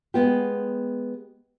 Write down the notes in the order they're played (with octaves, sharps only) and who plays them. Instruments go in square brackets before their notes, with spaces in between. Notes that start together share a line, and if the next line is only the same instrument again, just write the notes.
[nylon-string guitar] G#3 B3 G4